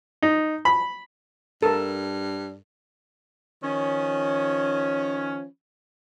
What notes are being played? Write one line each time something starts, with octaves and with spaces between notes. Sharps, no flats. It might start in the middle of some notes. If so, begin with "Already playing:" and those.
D#4
B5
G2 A4 A#4
D#3 F3 C#4